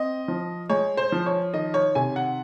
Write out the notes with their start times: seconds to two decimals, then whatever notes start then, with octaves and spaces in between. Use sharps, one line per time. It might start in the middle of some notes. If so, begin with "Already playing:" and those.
Already playing: C4 D#5
0.28 F3
0.70 G#3 C#5
0.97 C5
1.12 F3
1.26 C#5
1.54 D#3 D#5
1.74 C#5
1.95 C3 G#5
2.16 F#5